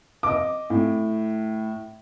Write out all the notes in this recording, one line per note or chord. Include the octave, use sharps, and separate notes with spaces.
D#5 D6
A2